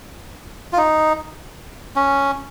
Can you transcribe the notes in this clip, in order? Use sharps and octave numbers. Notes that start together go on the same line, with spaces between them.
F4
D#4
C#4